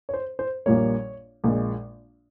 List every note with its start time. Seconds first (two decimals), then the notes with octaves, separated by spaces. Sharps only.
0.09 C#5
0.14 C5
0.39 C5
0.66 A#1 A#2 G3 A#3 C#5
1.44 A#1 A#2 G#3